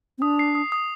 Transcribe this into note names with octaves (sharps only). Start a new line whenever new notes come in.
C4
D4 D#6
C7
D#6
D#6